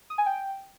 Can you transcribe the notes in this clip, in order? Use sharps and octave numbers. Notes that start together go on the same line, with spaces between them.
D#6
G#5
G5